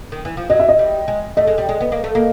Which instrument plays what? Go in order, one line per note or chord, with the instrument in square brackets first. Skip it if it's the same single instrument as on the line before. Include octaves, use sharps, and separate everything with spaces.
[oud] D#3
E3
F3
[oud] F#3 [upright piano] D#5
[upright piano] E5
D#5
[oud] G3
G#3
[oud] A3 [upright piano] D#5
[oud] G#3
G3
G#3
B3
A#3
A3
A#3